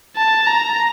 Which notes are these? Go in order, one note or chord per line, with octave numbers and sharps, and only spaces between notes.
A5
A#5